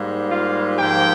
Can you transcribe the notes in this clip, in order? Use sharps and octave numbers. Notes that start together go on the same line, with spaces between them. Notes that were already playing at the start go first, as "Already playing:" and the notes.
Already playing: G#2 G3 A#3
F4 F5
G#2 F3 A#3 G4 G5